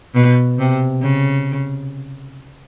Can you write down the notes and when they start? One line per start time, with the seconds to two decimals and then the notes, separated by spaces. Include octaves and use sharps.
0.15 B2
0.59 C3
1.02 C#3